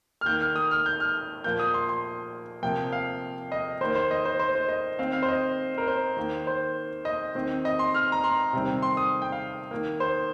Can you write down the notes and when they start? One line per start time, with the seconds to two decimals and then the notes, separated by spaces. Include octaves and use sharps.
0.21 F6
0.26 D#3 A#3 G6
0.41 F6
0.56 D#6
0.71 F6
0.86 G6
1.00 F6
1.44 A#2 F3 A#3 G6
1.59 D#6
1.74 C6
1.89 C6
2.63 C3 F3 A#3 G5
2.92 F5
3.52 D#5
3.81 D#3 A#3 C5
3.95 C5
4.11 D#5
4.25 C5
4.39 C5
4.55 C5
4.69 D#5
4.99 D#3 C4 F5
5.13 F5
5.22 C5
5.28 D#5
5.78 A#4
5.88 C5
6.17 D#3 A#3
6.47 C5
7.05 D#5
7.35 D#3 C4
7.65 D#5
7.79 C6
7.94 F6
8.12 A#5
8.24 C6
8.53 C3 D#3 G3 C4
8.83 C6
8.97 D#6
9.22 G5
9.32 F5
9.71 D#3 A#3
10.00 C5